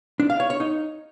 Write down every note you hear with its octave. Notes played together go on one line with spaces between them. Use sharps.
D4
F5
C#5
C#5
D#4